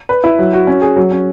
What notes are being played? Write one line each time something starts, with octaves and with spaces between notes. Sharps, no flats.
B4
E4
F#3
F#4
C#4
G#4
F#3
C#4